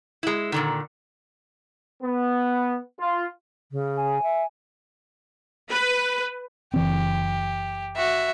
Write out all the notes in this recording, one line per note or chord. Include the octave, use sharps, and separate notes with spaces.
G#3 E4
A#2 D3 D#3
B3
F4
C#3
G#5
E5
B4
F#1 E3 C4 G4
F#4 E5